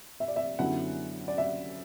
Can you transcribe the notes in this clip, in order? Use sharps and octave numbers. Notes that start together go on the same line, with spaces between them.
E5
D5
E5
F#2 D3 F#3 B3 E4 F#5
D5
E5